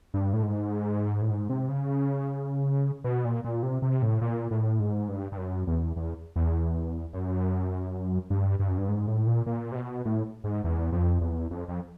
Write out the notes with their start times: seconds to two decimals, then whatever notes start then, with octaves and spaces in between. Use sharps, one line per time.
0.14 G2
0.33 A2
0.43 G#2
1.22 A2
1.30 G#2
1.49 C3
1.69 C#3
3.04 B2
3.25 A#2
3.44 A#2
3.63 C3
3.82 C3
4.02 A2
4.21 A#2
4.51 A2
4.80 G#2
5.09 G2
5.32 G2
5.38 F#2
5.67 E2
5.96 E2
6.36 E2
7.13 F#2
8.30 G2
8.59 G2
8.68 F#2
8.78 G2
8.89 G#2
9.07 A2
9.27 A#2
9.46 A#2
9.72 C3
9.76 B2
10.05 A2
10.44 G#2
10.64 E2
10.92 F2
11.21 E2
11.51 F2
11.68 F2